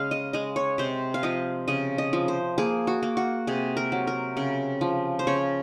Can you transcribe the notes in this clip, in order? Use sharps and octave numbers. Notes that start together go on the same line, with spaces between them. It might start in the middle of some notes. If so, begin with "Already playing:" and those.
Already playing: C#3 G#3 F5
D#5
G#3 D#5
C#5
C3 C5
F5
F3 D#5
C#3 D#5
D#5
F3
C5
A#3 G#4
F#4
A#3
F#4
C3 G#4
A#4
F#3
A#4
C#3
F3
C5
C#3 C#5